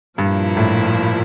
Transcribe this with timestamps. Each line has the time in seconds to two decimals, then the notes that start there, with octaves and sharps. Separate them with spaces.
0.18 G2 A#2 F3 A#3 E4
0.57 A2